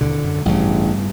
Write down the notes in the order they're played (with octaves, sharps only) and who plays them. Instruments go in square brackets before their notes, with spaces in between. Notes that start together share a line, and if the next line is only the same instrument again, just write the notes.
[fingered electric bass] D#2 B2 [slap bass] D3
[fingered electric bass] F#2
[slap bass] A1 C#3 [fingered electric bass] G2 G3 B3